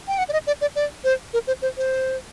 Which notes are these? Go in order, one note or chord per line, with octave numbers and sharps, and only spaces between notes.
G5
F#5
D5
D#5
D5
D5
D5
C5
A#4
C5
C5
C5